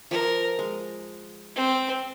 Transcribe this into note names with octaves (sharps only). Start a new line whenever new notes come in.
F3 A#4
G#3
C4